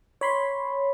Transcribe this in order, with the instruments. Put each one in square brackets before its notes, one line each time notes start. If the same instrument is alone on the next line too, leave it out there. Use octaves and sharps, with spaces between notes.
[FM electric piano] C#5 B5 C6